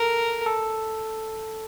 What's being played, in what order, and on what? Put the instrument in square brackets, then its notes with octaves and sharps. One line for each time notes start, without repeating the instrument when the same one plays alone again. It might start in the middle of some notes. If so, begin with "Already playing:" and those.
Already playing: [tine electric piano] A4 [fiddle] A#4
[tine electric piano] A4